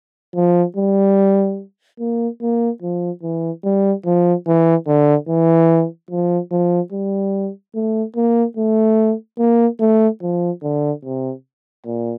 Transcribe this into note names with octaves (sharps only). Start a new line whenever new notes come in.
F3
G3
A#3
A#3
F3
E3
G3
F3
E3
D3
E3
F3
F3
G3
A3
A#3
A3
A#3
A3
F3
D3
C3
A#2